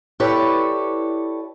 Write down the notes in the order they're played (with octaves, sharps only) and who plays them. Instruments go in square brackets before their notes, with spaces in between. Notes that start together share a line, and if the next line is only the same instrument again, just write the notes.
[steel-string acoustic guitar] E4 G4 A4 B4 C#5 D5